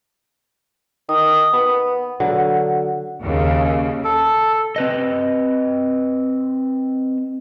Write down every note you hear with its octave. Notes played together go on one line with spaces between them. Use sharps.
D#3 D#6
B3
D3 F#3
D#2 C#3
A4
C4 B4 D#5